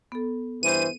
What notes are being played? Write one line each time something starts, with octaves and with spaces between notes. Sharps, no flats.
B3 A4
G2 E3 C5 D#7